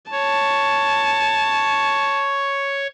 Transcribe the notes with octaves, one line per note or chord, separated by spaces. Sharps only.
C#5 A5